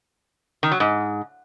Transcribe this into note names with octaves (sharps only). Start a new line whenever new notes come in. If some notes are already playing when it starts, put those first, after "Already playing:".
D#3
F#3
G#2